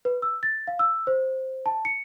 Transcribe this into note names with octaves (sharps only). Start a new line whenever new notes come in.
B4
E6
A6
F5
E6
C5
A5
C#7